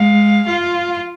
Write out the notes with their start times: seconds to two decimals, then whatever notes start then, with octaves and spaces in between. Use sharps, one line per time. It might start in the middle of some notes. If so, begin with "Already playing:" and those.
Already playing: G#3 F5
0.47 F4
0.94 F5